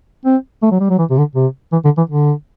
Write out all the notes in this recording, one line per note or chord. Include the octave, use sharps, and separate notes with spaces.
C4
A3
F#3
G3
F#3
E3
C3
D3
C3
E3
D3
E3
D3